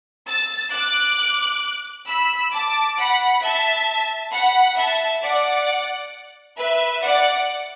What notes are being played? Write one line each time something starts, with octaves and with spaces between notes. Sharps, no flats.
E6 A6
D6 F#6
B5 E6
A5 D6
F#5 B5
E5 A5
F#5 B5
E5 A5
D5 F#5
B4 E5
D5 F#5